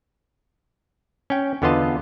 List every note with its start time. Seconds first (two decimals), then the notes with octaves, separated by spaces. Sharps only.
1.30 C#4 G5
1.62 E2 D3 B3 F4 D#5 A5